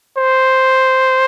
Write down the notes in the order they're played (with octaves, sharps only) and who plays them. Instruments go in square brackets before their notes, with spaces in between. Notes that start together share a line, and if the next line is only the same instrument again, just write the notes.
[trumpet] C5